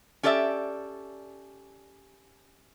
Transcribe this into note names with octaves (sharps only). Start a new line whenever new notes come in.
C#4 G4 A4 D5 E5